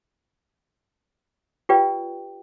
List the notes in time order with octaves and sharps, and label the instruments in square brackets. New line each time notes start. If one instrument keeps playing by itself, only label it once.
[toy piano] F4 G4 B4 D5 G5